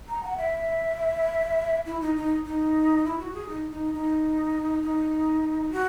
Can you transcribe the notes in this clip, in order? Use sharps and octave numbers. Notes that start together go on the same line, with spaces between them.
A#5
F#5
E5
E4
D#4
D#4
D#4
E4
F#4
G#4
D#4
D#4
D#4
D#4
F#4